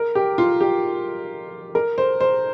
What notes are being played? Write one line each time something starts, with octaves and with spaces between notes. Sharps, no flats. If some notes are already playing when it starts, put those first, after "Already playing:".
Already playing: A#4
G4
F4
G4
A#4
C5
C5